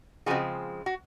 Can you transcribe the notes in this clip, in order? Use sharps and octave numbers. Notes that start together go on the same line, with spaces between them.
C#3 F3 G#3 C4 F#4 G#4
F#4